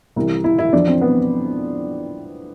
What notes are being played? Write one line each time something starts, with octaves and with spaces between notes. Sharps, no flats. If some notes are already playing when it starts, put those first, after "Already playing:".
C2 C3 E3
E4
E4
F2 E3 D4
C4
B3